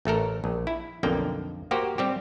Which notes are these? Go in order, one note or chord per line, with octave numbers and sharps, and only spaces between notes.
A1 A3 A4 A#4
A#1
E4
B1 F2 D3 A#3 G5
A#3 F#4 G4 C5
G3 C4 G4